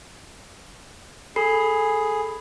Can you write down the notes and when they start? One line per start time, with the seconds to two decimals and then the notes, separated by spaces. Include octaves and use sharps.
1.36 G#4 A4 B5 C7